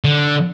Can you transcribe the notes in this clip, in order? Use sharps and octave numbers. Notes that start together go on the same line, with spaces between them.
D3